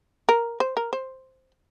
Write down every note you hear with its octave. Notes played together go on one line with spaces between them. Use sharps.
A#4
C5
A#4
C5